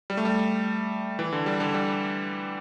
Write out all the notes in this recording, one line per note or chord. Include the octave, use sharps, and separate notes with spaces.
G3
A3
G3
E3
D3
G3
D3
G3